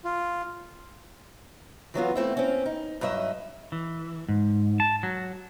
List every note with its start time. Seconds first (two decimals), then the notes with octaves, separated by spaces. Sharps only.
0.04 F4
1.94 E3 F#3 B3 F4
2.15 A3 C4 E4
2.37 C4 C#4
2.66 D#4
3.01 G2 F#3 D#5 E5
3.72 E3
4.29 G#2
4.80 A5
5.03 F#3